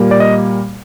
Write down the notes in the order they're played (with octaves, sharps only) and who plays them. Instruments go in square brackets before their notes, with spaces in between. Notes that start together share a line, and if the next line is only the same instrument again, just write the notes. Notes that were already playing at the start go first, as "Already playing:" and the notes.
Already playing: [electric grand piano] A#2 G3 A#3
D5
D#5